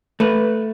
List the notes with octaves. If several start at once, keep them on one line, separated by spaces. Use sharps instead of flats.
A3 B4